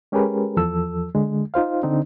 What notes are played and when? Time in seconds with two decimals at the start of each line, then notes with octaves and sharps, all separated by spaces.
0.12 G#3 C#4 G4 G#4 A#4 B4
0.57 E2 F3 A4 E6
1.15 D3 G#3
1.54 D#4 F4 C5 F5
1.83 D3 C4 D4 D#4